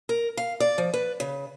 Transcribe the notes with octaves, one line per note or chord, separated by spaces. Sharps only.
A#4
F5
D5
F3
B4
C#3